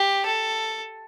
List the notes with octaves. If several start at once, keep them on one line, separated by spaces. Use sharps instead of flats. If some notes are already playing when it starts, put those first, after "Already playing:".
Already playing: G4
A4